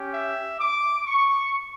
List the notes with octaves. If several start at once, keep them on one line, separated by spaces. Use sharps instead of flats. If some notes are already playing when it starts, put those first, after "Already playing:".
Already playing: C#4 G4
E5
D6
C#6